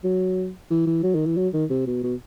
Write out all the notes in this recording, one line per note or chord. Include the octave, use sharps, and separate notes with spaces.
F#3
E3
E3
F#3
D#3
E3
F#3
D#3
C3
B2
B2